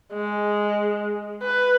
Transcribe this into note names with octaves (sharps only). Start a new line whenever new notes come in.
G#3
B4